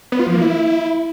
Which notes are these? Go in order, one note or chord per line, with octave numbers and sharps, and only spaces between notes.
B3
F4
F3
A#3
E4